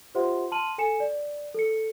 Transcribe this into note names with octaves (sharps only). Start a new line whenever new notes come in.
F4 G4 C5 E5 F#5 C6
A5 C6 F6 D#7 F#7
A4 G#5 C#7 E7
D5
A4 C#7